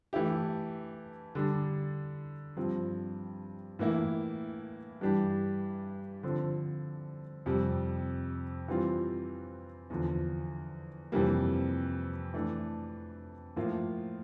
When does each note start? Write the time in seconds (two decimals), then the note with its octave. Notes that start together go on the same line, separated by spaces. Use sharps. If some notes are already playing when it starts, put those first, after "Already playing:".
0.13 E3 A3 E4 G4
1.35 D3 G3 D4
2.57 G2 F3 C4
3.79 A2 E3 A#3 E4
5.01 G2 E3 G3 D4 G4
6.23 D3 F3 C4
7.46 F2 C3 G3
8.68 E3 G3 C4 F4
9.90 E2 D3 F3
11.12 F2 C3 E3 G3 A#3
12.34 E3 A3 D4
13.56 A2 F3 A#3 F4